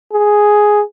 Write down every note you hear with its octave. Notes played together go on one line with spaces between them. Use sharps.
G#4